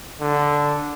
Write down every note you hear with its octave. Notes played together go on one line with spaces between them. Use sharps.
D3